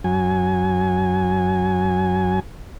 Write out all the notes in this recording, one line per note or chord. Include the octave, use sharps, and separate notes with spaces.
F#2 F#3 G#5